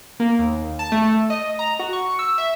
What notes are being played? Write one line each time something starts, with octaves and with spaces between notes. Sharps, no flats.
A#3
D#2
A5
A3
D#5
A#5
F#4
C#6
E6
E5